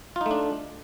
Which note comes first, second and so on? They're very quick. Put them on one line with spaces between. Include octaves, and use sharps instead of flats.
F4 D#4 A3 D4